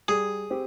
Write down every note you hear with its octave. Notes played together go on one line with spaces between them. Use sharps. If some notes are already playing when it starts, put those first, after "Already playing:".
G3 G#4
C4 G4